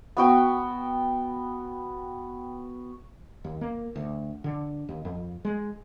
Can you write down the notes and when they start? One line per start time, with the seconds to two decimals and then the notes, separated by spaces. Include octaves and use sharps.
0.17 B3 F#4 G5
3.44 D#2
3.61 A#3
3.96 D2
4.44 D3
4.89 D#2
5.05 F2
5.45 G#3